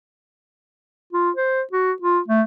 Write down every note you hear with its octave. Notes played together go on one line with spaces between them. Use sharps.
F4
C5
F#4
F4
A3